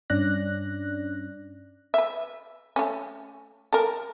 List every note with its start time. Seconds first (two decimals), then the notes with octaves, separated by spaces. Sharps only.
0.10 G2 C#4 D4 D5 F#6 A#6
1.94 B4 E5
2.76 A3 C#4
3.73 A4 A#4